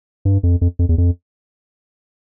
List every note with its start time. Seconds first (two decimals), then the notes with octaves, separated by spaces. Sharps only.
0.25 G2
0.43 F2
0.61 F2
0.79 F2
0.89 E2
0.98 F2